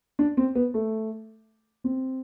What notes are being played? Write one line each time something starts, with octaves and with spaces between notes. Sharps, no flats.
D4
C4
B3
A3
C4